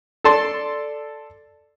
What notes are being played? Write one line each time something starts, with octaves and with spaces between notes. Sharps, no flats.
A4 D5 A5 C6